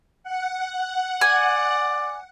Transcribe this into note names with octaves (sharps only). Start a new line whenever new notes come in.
F#5
D5 G#5